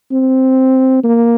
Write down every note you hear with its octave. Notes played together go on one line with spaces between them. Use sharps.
C4
A#3